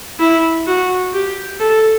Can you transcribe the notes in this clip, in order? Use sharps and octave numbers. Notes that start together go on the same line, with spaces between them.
E4
F#4
G4
A4